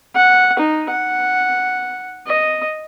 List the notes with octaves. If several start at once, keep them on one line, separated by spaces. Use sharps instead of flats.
F#5
D#4
F#5
D#5